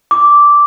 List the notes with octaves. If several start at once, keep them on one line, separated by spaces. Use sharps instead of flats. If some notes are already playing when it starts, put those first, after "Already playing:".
D6